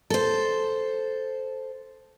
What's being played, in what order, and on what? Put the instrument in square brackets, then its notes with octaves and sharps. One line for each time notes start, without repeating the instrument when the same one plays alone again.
[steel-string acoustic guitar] A4 C5